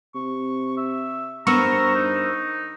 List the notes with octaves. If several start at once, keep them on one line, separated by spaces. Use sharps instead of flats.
C3 C#6
E5
G2 B3 A#4 C5 A#5 C#6 E6
D#4